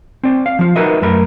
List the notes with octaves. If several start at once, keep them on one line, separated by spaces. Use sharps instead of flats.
C4 D5
F5
F3 F4
D#4 F#4 A#4 B4 D#5 E5
F#2 A3 A#4 B5